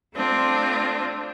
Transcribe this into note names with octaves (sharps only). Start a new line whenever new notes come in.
A3 C4 D4 F4